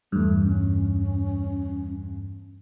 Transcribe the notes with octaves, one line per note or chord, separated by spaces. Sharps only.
E2 G2 A3
C#4